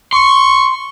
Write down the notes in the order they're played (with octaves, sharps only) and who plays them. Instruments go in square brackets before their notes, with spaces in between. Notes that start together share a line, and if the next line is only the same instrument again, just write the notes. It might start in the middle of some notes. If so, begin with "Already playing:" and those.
[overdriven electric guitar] C6 [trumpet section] C#6